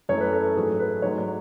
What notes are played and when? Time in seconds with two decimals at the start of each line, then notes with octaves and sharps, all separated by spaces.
0.09 F#2 E3 A3 C#5
0.21 B4
0.33 A4
0.56 G#2 F#3 A3 G#4
0.80 B4
1.02 G#2 F#3 A3 C#5
1.18 D5